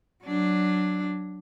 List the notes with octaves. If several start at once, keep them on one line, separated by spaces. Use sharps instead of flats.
F#3 D4